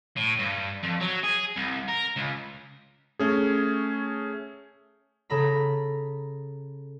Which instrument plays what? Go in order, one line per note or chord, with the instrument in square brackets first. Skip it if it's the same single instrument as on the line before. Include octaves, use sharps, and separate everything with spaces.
[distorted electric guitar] A2
G2
F2
F#3
G#4
C2
A#4
C#2
[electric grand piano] A3 C#4 G#4
[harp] C#3 A4 A#5 B5